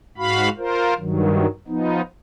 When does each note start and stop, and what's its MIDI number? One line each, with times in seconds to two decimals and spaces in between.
0.18 0.49 44
0.18 0.49 66
0.18 0.49 77
0.18 0.49 83
0.58 0.94 65
0.58 0.94 70
0.58 0.94 72
0.99 1.46 43
0.99 1.46 51
0.99 1.46 54
1.68 2.01 53
1.68 2.01 59
1.68 2.01 63